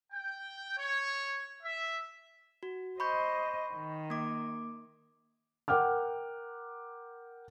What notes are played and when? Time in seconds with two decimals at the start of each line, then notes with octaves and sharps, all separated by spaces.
0.13 G5
0.78 C#5
1.63 E5
2.63 F#4
3.00 C5 D#5 B5 C#6 G6
3.73 D#3
4.10 A#3 D6
5.68 A#4 F#5 G5 D6 F6